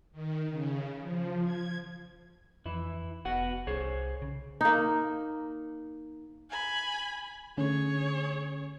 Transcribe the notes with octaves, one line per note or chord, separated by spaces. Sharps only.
D#3
C#3
F3
G#6
F2 E3 E4
F1 B3 F#4 F#5
C2 G#4 C5 C#5
C#3
A#3 D#4
G#5 B5
D3 A3 C#4 G#4 C#5